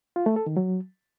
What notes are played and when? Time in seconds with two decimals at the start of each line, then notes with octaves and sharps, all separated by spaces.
0.16 F4
0.26 A3
0.36 A4
0.46 D#3
0.57 F#3